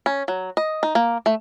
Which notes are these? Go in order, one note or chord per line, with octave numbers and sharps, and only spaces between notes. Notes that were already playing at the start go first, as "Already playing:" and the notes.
C#4
F#3
D#5
D#4
A#3
A3